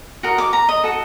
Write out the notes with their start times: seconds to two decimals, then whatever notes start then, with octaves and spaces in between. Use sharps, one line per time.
0.23 F#4 A#4 D#5
0.38 D6
0.53 A#5
0.69 D#5
0.83 F#4 A4 D#5